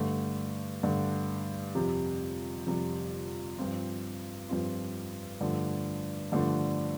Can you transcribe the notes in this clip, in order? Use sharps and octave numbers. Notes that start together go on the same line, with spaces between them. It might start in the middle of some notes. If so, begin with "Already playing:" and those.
Already playing: G2 D3 A3
G2 D3 A3
F2 C3 G3
F2 C3 G3
G2 F3 C4 F4
G2 F3 C4 F4
G2 D3 F3 A3 D4
G2 D3 F3 A3 D4